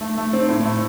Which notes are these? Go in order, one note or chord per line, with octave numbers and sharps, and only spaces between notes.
A3
A3
C4
A2
A3